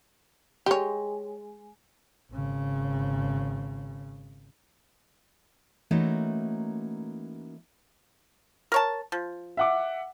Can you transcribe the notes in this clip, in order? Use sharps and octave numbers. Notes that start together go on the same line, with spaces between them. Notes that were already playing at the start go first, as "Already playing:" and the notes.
G#3 G4 C#5 C6
G#1 C#3
E3 A3 A#3 C#4 D#4 F#4
A#4 C#5 A5
F3
E5 F#5 D6